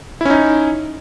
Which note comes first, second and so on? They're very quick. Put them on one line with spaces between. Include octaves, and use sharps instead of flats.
E4 C#4 D#4